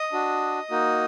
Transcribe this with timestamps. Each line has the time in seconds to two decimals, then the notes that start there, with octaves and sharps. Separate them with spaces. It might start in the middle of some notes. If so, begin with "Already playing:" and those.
Already playing: D#5 D#6
0.12 D4 F#4
0.71 A#3 D#4 F#4